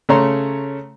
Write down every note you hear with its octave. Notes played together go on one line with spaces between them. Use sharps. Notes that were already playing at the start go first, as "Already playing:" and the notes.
C#3 A3 C#5 A#5 C6